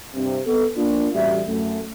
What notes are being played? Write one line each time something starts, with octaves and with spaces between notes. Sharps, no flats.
G2 C3
B3 A4
A#3 D4 F4
A1 G3 F#4 E5
F#2 A3